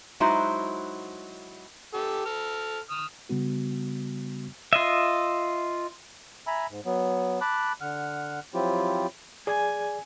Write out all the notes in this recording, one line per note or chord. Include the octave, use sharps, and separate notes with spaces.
F#3 G#3 D#4 E4 F#4 C5
G4 A4
A4 F6
D#6 F6
C#3 G3 B3 F#4
F4 D#5 E5
E5 G#5 A#5 B5 E6
G#2
F#3 B3
A5 B5 D6 F#6
D3 F#5 F6
F3 F#3 C4 E4 F4 G4
G#4 D5 G#5